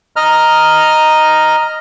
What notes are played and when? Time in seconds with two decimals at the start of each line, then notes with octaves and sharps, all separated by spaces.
0.16 D#5 A#5 F6